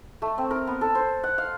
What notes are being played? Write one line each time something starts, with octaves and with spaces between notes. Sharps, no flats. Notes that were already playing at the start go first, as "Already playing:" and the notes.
A3
C4
A#4
B3
A4
C5
F#5
F5